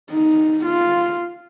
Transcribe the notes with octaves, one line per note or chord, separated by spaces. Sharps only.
D#4
F4